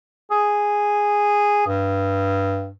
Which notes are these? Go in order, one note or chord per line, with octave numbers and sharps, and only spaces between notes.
G#4
G2